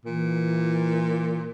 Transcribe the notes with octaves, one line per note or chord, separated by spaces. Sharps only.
A#2 E3